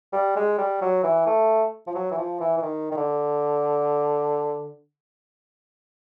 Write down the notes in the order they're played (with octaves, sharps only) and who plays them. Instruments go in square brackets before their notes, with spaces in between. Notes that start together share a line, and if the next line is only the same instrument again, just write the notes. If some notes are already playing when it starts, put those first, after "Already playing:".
[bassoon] G3
G#3
G3
F#3
E3
A3
F3
F#3
E3
F3
E3
E3
D#3
D#3
D3